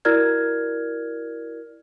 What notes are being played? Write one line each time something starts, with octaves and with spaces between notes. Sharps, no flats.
E4 F#4 A#4 D5 F6 G#6